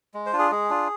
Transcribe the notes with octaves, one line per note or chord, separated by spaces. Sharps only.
G#3
C5
D4 F4
G#4
G#3 G#4
D4 F4